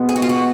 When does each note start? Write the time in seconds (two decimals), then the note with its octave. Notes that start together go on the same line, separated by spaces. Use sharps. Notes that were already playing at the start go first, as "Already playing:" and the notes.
Already playing: B2 G#3 B3
0.09 G#4
0.16 F#4
0.22 F4
0.29 F#4